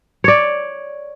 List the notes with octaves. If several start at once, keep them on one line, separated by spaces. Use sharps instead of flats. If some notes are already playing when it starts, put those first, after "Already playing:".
C#5 D5